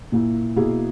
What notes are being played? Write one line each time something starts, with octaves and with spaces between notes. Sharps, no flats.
A#2 A#3 E4
B2 A#3 E4 G#4